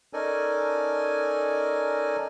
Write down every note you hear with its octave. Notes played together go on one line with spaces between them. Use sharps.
C#4 D#4 A4 A#4 D5 G#5